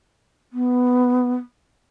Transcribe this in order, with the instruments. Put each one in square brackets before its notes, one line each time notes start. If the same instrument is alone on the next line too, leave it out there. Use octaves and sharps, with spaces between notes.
[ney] B3